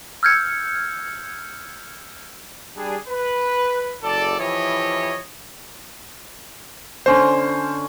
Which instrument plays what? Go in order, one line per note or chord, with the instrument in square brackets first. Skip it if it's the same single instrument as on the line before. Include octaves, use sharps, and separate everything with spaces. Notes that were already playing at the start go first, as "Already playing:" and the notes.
[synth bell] E6 F6 G6 G#6 C#7
[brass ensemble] G3 D4 G#4
B4
F#1 A4 D5
E3 F3 E4 G4 C#5 D#5
[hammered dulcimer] D3 C#4 C6 [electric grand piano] C5